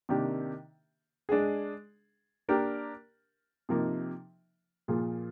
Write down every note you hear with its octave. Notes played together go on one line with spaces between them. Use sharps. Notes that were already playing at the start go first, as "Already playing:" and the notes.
C3 D#3 A#3 D4 G4
G#3 D4 G#4
A#3 D4 G4 A#4
C3 F3 A#3 D#4
A#2 F3 A#3 F4 G#4